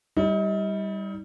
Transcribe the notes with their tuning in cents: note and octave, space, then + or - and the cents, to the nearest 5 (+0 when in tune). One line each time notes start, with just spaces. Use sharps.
G3 +0 D#4 +40